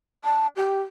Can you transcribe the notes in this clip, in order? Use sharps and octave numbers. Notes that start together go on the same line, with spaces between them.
A5
G4